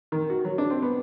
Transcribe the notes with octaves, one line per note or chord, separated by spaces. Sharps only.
D#3
F#4
F#3
D4
C4
B3